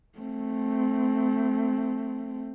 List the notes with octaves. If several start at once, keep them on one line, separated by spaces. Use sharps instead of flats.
A3 C4